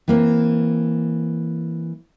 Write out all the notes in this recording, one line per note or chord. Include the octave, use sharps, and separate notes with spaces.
E3 A#3 C4